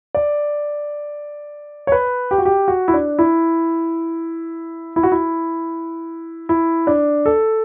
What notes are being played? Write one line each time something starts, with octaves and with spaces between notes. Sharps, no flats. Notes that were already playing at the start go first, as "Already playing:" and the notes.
D5
C#5
B4
G4
F#4
G4
F#4
E4
D4
E4
E4
F#4
E4
E4
D4
A4